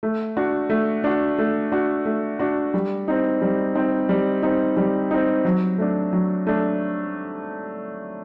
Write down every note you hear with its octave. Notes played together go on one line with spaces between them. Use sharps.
A3
D4 F#4
A3
D4 F#4
A3
D4 F#4
A3
D4 F#4
G3
C4 D#4
G3
C4 D#4
G3
C4 D#4
G3
C4 D#4
F#3
A3 D4
F#3
A3 D4